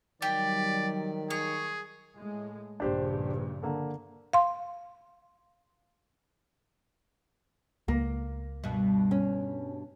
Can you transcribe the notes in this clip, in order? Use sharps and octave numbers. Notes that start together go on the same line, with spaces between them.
D#3 F#3 G3 G4 D5
G#4 C#5
A2 G#3
A#1 G2 C#3 D4 G4 C5
D3 A#3 A4
F5 C6
C#2 A#3
G2 B2
C#4